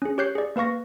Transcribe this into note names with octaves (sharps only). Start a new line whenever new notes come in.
C#4 G#4
G4 C#5 F#6 G6 C7
G#4 D5
A#3 B4 F5 C#6 A#6